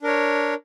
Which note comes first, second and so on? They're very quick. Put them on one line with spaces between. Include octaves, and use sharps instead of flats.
D4 A#4 C#5